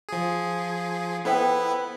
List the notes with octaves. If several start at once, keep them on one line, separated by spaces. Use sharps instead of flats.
F3 G#4
B3 E4 A4 B4 C5 G5